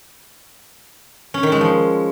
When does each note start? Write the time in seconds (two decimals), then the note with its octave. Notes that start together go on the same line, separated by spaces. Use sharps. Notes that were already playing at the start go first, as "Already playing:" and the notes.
1.34 C#4
1.43 D#3
1.52 G#3
1.61 F3